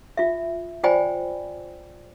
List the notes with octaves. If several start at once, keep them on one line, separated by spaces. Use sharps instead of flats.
F4 E5
F4 C5 D5 G5 G#5 B5